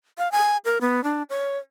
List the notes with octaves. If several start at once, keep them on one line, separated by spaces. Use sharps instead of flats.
F5
G#5
A#4
B3
D4
C#5